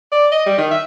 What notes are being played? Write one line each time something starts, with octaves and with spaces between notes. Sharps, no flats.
D5
D#5
G3
D#3
E5